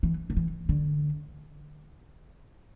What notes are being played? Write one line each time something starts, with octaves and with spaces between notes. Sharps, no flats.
E3
D3
E3
D3